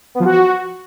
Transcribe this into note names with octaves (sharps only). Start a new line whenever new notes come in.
B3
F3
F#4